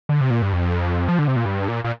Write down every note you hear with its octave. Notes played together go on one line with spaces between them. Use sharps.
D3
C3
A#2
G2
F2
F3
D3
C3
A#2
G2
A#2
A#2